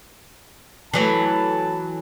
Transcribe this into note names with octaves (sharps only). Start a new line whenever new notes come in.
E3 F#3 A3 A5